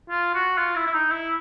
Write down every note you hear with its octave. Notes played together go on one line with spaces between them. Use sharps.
F4
F#4
F4
E4
E4
D#4
E4